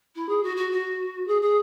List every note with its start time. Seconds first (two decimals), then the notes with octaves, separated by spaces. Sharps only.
0.15 E4
0.28 G#4
0.43 F#4
0.56 F#4
0.71 F#4
1.27 G#4
1.42 G#4